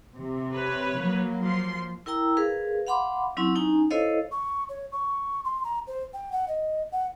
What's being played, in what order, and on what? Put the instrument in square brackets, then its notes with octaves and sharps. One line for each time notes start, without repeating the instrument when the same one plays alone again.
[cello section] C3
[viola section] B4 C#5
[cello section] F#3 A#3
[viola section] F3 C6
[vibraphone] E4 A#4 G5 A#5 E6
G#4 A#4 B4 F5
F5 F#5 B5 C6 D6
F#3 C4 C#4 E4
C#4 D#4 G#5 A#5
E4 A4 C5 C#5 D#5 F5
[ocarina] C#6
C#5
C#6
C6
A#5
C5
G5
F#5
D#5
F#5